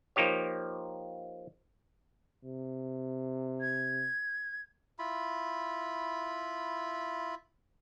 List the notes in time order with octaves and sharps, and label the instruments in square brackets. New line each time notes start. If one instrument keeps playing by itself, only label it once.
[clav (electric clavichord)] F3 A#3 D#4 G4 C#5
[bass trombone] C3
[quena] G#6
[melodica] E4 F4 B5